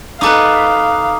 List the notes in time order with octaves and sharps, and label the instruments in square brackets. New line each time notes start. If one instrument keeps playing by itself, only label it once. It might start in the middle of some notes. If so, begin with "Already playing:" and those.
[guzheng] D#4 A4 B4 [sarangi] F5 [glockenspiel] A#5 D6 D#6